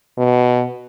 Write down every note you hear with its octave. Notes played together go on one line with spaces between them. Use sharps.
B2